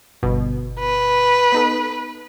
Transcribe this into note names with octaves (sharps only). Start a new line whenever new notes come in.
G1 B2
B4
B3 D#4 A4